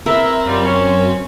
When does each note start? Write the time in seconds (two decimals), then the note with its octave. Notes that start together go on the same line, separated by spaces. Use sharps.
0.06 C4 E4 A#4 B4 E5
0.46 F#2 G3 F4
0.65 C#4